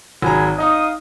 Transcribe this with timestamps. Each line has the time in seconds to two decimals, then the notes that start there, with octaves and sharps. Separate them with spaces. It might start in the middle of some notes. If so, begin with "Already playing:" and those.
0.22 G#1 F#3 G#4 G#5 A#5 B5
0.58 D#4 D#5 F5 D#6